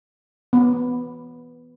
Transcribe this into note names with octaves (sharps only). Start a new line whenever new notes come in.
B3